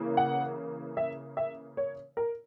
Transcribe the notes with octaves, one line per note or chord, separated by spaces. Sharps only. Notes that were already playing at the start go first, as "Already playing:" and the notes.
Already playing: C#3 E3 A#3
F#5
E5
E5
C#5
A#4